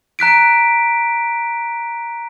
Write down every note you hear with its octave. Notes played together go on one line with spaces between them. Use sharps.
A#5 F#6 B6 D7